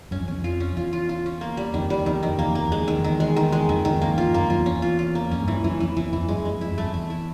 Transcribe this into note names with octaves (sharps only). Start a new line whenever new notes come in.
F#2 C#4
F2
E2 C#4
F2
F4
C#4
E2 F4
F4
F4
C#4
A#3
G3
F2 D#3
F2 G3
E2 D#3
F2 D#3
E2 A#3
F2
E2 A#3
F2 G#3
E2
D#3
F2
E2 D#3
G#3
D#3
G#3
F2 D#3
F2 D#3
E2 A#3
F2
E2 F4
F2
F#2 A#3
F2 F4
E2
C#4
E2
F4
F4
A#3
F2 C#4
G2
E3
G2
F#2 E3
F2 E3
E2 E3
F2 E3
G2 G#3
F#2
G#3
F2 E4
G#2
G2
A3
F2
E2 A3
E4